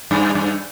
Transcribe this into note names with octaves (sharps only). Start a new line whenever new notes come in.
G2
G2